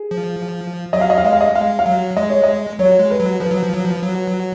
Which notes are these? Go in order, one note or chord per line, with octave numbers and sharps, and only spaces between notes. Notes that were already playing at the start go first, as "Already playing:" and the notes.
Already playing: G#4
F3
F#3 D#5
F5
D#5
F5
G#3 D#5
F5
D#5
G#3 F5
F5
F#3
G#3 D#5
C#5
D#5
F#3 C#5
G#3
B4
F#3
F3 B4
F#3
F3
F#3
F3
F#3